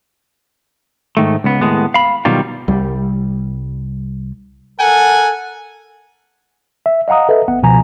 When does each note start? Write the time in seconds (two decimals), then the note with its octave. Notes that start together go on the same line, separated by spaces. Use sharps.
1.17 G#2 D#3 A3
1.44 C#2 B3
1.61 D#2 A2 G#3 B3
1.94 F5 B5
2.25 B2 D#3 F#3 G3 F4
2.68 C2 G3
4.79 A4 A#4 F#5 G#5
6.86 E5
7.08 D#5 F5 F#5 A#5 D#6
7.29 A4 B4 D#5 E5
7.48 G#1 B3 F#5
7.62 C#2 B2 F3 G#5 A#5